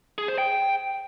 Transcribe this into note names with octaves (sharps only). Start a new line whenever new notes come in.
G#4
C5
G5